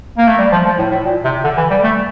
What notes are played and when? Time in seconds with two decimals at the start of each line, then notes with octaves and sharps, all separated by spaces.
0.18 A#3
0.28 A3
0.38 G3
0.52 F3
0.65 F3
0.79 A2
0.91 A2
1.05 A#2
1.24 C3
1.44 D3
1.57 E3
1.71 G3
1.83 A3